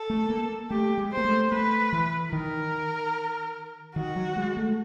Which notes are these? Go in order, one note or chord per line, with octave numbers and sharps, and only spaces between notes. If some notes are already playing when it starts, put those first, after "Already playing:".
Already playing: A4
A3
A#3
A3 G4
G#3
C5
A#3
A3
A3 B4
E3
D#3 A#4
D#3 F#4
F#3
G#3
A3